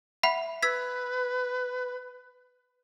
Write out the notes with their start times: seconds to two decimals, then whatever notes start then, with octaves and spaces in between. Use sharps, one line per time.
0.23 E5 F#5 B5
0.62 B4 E6 G#6 B6